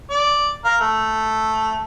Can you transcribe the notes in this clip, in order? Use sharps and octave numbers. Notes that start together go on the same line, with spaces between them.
D5
A#4 F5
A3